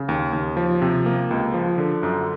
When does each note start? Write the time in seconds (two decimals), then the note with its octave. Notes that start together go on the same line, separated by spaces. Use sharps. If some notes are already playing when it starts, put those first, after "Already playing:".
Already playing: C#3
0.09 D#2
0.33 D#2
0.57 F3
0.82 C3
1.06 A#3
1.31 C#2
1.54 F3
1.78 D3
2.03 F#2